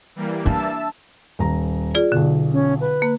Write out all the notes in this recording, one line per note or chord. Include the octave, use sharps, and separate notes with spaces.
E3 G3 A#3
D4 E5 A5 E6
D#1 A#5
F4 G#4 D5
B1 B2 D3
C#4
B4
A#3